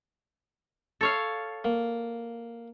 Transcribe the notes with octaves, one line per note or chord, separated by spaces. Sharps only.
A4 C#5 F5
A#3